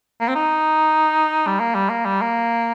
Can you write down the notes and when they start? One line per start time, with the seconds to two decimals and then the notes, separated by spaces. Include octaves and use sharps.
0.21 A#3
0.28 C4
0.35 D#4
1.47 G3
1.60 A#3
1.75 G3
1.90 A#3
2.05 G3
2.22 A#3